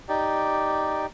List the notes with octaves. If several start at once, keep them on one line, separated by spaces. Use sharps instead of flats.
D#4 G4 D5